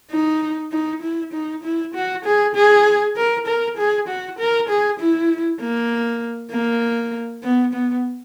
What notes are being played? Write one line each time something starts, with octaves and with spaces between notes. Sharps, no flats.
D#4
D#4
E4
D#4
E4
F#4
G#4
G#4
A#4
A#4
G#4
F#4
A#4
G#4
E4
A#3
A#3
B3
B3